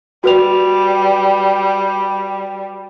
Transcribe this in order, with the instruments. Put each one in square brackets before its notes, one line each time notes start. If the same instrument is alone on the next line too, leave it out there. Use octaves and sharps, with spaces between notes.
[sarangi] G3 [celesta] F#4 B4 F7